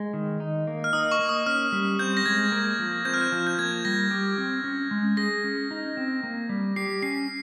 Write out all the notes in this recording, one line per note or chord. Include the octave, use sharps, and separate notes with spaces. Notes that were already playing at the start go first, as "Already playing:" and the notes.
Already playing: G#3
D#3
D#4
A#3
F6
D#4 D#6
C#6
A#3
D#6
C#4 F6
G3
C4 G6
A#6
G#3 G#6
A#3
F3
C4 G6
F6
G6
F3
G6
A#3 G#6
G3 A#6
G4
C4
C#4
G#3
G#4 A#6
C#4
D#4
C4
A#3
G3
G4 C7
C#4 C7